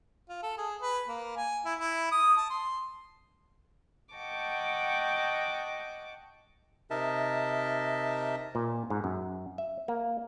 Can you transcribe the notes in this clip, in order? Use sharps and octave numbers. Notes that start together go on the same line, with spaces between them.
F4
A4
G#4
B4
A#3
G#5
E4
E4
D#6
A5
C6
D#5 F#5 G5 A5 C#6 D6
C3 D#4 A#4 D#5 E5 A5
A#2
G#2
F#2
E5
A#3